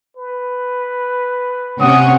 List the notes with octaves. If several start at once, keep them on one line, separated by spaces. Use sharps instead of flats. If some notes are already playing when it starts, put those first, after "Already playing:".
B4
C3 C#4 F#5 D#6